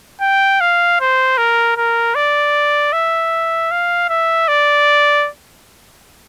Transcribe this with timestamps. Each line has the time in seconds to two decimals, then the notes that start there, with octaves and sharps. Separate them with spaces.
0.21 G5
0.61 F5
1.00 C5
1.38 A#4
1.77 A#4
2.15 D5
2.93 E5
3.71 F5
4.09 E5
4.48 D5